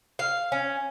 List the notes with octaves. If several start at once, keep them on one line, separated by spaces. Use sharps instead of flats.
F5
C#4